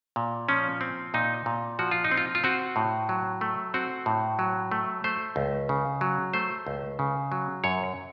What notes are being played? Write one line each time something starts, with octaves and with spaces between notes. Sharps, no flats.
A#2
F3 C#4
C4
A#2 D#4
A#2
F3 F#4
F4
D#4
C4
F4
F4
C4 F#4
A2
F#3
A3
C4 F#4
A2
F#3
A3
A3 C5
C#2
C#3
F#3
A3 C5
C#2
C#3
F#3
F#2 C#5